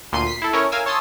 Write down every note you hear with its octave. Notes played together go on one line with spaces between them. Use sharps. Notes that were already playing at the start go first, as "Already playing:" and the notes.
D2 A#2 C6 C7 D#7
B6 C7
E4 A4
C#4 E4 A#4 C#5
A#4 F5 G#5 E6
C#5 A5 C6 D#6 E6